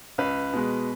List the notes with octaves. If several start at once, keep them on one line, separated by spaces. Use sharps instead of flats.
C#2 B4
B2 G#3